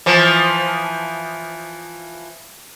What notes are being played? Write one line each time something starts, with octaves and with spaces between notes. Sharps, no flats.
E3 F3